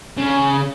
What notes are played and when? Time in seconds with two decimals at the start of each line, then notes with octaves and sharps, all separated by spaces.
0.18 C#3